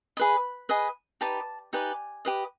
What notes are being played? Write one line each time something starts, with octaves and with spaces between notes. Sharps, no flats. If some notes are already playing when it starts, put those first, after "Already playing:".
G#4 B4 D#5 B5
G#4 B4 D#5
D#4 G4 B4 D5 A5
D#4 G4 B4 D5 G#5
G4 B4 D#5